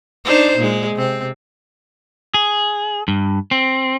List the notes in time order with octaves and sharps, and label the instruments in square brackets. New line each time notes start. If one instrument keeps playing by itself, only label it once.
[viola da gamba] D4 D#4 C5
A#2 G#3
C3 C4
[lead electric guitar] G#4
G2
C4